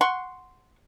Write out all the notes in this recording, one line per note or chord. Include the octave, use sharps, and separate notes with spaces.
F#5 C6 C#6